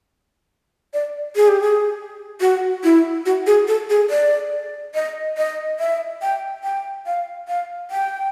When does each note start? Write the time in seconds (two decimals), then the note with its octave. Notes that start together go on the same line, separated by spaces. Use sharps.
0.94 D5
1.36 G#4
1.48 G4
1.62 G#4
2.41 F#4
2.84 E4
3.26 F#4
3.47 G#4
3.68 A4
3.90 G#4
4.10 D5
4.94 D#5
5.37 D#5
5.80 E5
6.22 G5
6.63 G5
7.06 F5
7.48 F5
7.91 G5